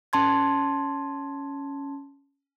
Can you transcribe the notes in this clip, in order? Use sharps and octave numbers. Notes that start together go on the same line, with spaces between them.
C#4 A5 C6 G#6